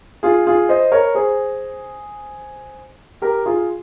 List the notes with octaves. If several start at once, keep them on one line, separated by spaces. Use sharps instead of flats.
F4 G#4
F4 G#4
C5 D#5
A#4 C#5
G#4 C5
G4 A#4
F4 G#4